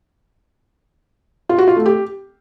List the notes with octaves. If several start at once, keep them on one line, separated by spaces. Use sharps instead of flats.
F4
F#4
F4
A3
G4